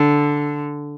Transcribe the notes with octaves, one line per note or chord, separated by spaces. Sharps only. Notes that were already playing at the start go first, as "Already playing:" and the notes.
Already playing: D3